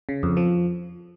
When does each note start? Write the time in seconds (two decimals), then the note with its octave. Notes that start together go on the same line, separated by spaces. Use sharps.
0.09 C#3
0.23 F2
0.37 F3